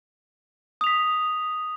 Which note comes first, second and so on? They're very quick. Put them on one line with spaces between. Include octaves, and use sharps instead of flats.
D#6 F7 B6